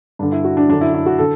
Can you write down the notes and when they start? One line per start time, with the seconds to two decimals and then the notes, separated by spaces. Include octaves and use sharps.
0.19 G2 D3 D4
0.32 E4
0.44 F#4
0.57 D4
0.69 F#2 D3 D4
0.81 E4
0.94 E4
1.06 F#4
1.19 D3 A4